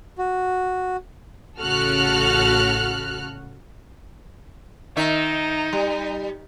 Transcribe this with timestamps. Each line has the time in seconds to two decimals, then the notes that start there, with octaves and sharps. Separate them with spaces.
0.18 F#4
1.58 A1 C#3 F#4 A4 F6 F#6
4.97 D#3 D#4 E5
5.73 G3